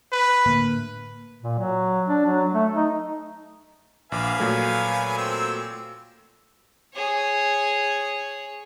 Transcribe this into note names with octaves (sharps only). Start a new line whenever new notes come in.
B4
A2 D3 A#3
A#2
F#3
D4
F#3
A3
D#4
A#1 B4 F5 G#5 D6
A#2 F#3 A3
C4 E6
G#4 C#5